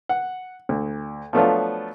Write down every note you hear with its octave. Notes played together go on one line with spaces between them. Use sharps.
F#5
D2
F3 F#3 A3 B3 D4 F4